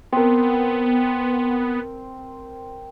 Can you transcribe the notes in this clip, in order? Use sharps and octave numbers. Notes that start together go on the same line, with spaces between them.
B3 C4 A#4